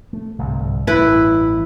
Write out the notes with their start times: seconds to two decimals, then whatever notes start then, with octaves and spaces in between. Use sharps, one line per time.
0.13 A3
0.38 G1 C2 G#2
0.87 A1 G2 E3 E4 B4